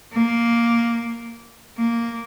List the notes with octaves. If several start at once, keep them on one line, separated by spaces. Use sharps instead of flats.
A#3
A#3